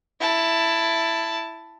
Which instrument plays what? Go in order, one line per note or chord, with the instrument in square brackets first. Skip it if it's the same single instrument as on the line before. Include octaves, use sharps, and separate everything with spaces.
[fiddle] E4 A5